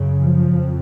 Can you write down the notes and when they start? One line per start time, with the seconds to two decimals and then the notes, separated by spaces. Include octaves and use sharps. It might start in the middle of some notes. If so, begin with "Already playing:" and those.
Already playing: F#2 C#3
0.19 F3
0.50 F2